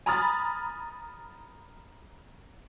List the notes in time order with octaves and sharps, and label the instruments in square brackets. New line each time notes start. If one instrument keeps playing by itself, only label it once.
[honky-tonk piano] G#5 A#5 B5 D#6 F6 A6